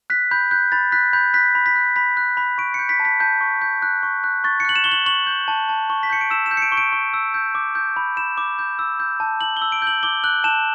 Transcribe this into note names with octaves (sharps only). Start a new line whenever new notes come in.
F#6 B6
B5 G6
F#6 G6
B5 A6
F#6 B6
B5 G6
F#6 B6
B5
B6
F#6
B5 B6
F#6
B5
C#6 D7
C#7
G6
B6
A5
B6
A5 G6
C#6
G6
F#6
C#6
F#6
C#6 A6
C#7
F#6 F#7
E7
C#6 G7
F#7
C#6 F#7
G6
A5
A5
C#6
B6
G6 C#7
D7
E6 E7
E7
G6
C#7
D7
C#6
D7
C#6
E6
G6
D6
G6
B5
B5 E7
D6
G6
E6
G6
A5
A5 F#7
G7
E6
D7
G6 F#7
D6 G7
F#6 F#7
A5 E7